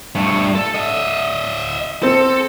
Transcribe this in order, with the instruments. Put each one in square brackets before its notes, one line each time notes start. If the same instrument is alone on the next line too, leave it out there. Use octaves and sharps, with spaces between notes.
[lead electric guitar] G2 A3
A4
D#5 E5
[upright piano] C4 [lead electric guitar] A4